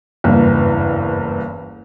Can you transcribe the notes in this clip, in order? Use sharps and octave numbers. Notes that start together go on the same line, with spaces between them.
F#1 E2 G2 E3